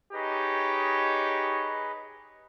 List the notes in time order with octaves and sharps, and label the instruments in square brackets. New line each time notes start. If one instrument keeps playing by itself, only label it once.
[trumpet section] D#4 G4 C#5 [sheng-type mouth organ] G#4 B4 D#5